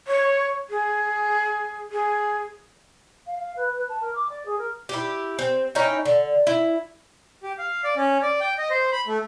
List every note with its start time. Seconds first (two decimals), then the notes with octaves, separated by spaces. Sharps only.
0.07 C#5
0.70 G#4
1.92 G#4
3.26 F5
3.38 F5
3.56 B4
3.75 B4
3.88 A5
4.01 A#4
4.15 D6
4.29 D5
4.45 G#4
4.58 A#4
4.89 E4 G4
5.39 C4
5.75 C#4 D#4 E4 G5
6.06 D3
6.47 E4
7.43 G4
7.58 F5
7.84 D5
7.97 C#4
8.22 D5
8.41 G5
8.58 D#5
8.70 C5
8.92 B5
9.07 A3